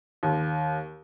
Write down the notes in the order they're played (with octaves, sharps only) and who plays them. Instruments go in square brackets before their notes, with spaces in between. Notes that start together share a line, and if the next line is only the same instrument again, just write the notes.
[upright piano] D#2